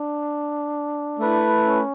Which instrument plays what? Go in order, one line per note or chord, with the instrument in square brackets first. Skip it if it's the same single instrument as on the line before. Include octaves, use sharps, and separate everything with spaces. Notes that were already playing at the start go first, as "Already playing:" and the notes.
Already playing: [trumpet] D4
[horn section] A3 E4 B4
[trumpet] C#4